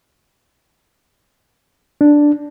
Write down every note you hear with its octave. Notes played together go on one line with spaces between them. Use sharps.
D4